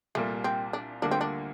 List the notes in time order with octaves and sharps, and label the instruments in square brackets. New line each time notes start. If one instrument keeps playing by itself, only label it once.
[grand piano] C2 A#2 G3 A#3 [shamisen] A3
[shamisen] C4
D4
[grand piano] D2 D3 G3 A#3 F4 [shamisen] D4
[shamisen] C4
D4